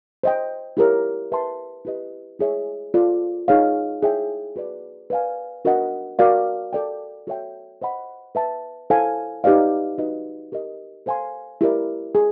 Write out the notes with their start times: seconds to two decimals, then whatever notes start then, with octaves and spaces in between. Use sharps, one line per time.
0.24 C5 D#5 G5
0.77 E4 G4 A#4 C#5
1.32 B4 E5 A5 C6
1.85 E4 G4 B4 D#5
2.39 E4 G#4 C#5 E5
2.94 F4 A4 D5
3.48 D#4 G#4 C#5 F5
4.02 E4 G#4 C#5 E5 G5
4.56 F#4 B4 D5
5.10 B4 D5 F5 G#5
5.65 D4 F#4 A#4 D#5 F#5
6.19 F#4 A#4 D5 F5
6.73 A4 D5 G5
7.27 F#4 A4 C#5 E5 G5
7.82 C5 D#5 F#5 B5
8.35 B4 E5 A5
8.90 E4 A4 C5 F5 G#5
9.44 D#4 G4 B4 D5 F5
9.98 D#4 F#4 B4 D#5
10.52 G4 A#4 D#5
11.06 A4 C5 F5 G#5 C6
11.61 E4 G4 A#4 D5
12.15 G#4